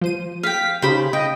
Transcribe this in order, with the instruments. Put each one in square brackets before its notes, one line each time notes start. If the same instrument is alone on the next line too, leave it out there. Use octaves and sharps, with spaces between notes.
[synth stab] F3 C5 D#7
[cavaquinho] F5 G5 [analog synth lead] B6
[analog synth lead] C#3 [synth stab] D#4 G4 [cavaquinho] C5 B5
[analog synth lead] D#5 [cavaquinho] G5